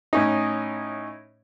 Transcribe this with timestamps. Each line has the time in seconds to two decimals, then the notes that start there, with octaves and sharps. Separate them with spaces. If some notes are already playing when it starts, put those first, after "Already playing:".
0.13 A2 C#4 D#4